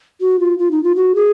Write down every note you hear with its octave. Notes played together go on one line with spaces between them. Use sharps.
F#4
F4
F4
D#4
F4
F#4
G#4